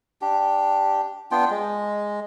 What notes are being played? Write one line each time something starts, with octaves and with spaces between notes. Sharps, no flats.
D4 G4
B3 D4 F4 G5
G#3